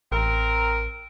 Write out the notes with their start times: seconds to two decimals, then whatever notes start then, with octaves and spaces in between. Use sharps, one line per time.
0.12 A1 C4 A#4